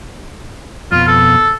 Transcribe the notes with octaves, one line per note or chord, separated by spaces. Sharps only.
F2 B2 F4
A4